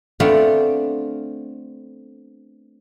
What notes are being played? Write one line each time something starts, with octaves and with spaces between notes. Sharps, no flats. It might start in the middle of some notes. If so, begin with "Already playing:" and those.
A3 B3 C4 D4 F4